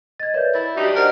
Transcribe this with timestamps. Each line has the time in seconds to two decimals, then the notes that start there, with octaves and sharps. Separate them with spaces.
0.20 D#5 G#6 A6
0.34 A#4 B4 C#5 D5 E5 G6
0.55 E4 E5 A6
0.77 F#3 D4 D#4 G4
0.96 A#4 C5 D#5 F#5